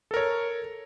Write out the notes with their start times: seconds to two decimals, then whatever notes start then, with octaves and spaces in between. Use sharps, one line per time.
0.11 A4
0.14 A#4
0.17 C#5